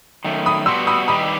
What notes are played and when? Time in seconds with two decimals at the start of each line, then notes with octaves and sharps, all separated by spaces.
0.24 F#2 D#3 A3
0.46 B5 D#6
0.66 G3 B3 F#4 C6 E6
0.87 B5 D#6
1.08 D#3 G3 D#4 G4 B4 B5 D#6